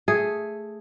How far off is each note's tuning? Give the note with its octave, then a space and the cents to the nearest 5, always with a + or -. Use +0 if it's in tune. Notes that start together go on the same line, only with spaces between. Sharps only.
A3 +0 G#4 +0